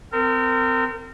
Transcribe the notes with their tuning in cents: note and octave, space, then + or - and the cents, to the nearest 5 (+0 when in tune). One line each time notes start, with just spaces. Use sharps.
C4 -25 A#4 -35